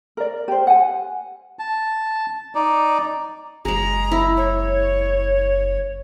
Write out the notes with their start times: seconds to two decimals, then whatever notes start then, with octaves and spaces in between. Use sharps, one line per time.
0.17 A#4 D5
0.48 G4 C5
0.67 F#5 G#5
1.59 A5
2.55 D#4 D5
3.65 F#1 G#3 G#4 A#5
4.11 E4
4.37 C#5